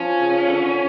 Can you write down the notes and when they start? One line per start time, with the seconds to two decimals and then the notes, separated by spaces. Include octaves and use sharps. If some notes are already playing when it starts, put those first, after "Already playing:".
Already playing: F3 C#4
0.20 C#3
0.47 D3